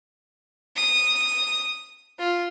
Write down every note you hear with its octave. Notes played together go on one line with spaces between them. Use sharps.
D#6
F4